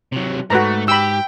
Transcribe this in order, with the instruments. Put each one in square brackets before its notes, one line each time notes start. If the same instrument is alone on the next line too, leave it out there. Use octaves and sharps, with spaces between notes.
[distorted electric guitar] C3 F#3
[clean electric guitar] G#2 [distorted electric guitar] A3 [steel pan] F#4 B4 A#5
[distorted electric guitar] G4 [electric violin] G5 [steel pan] B5 E6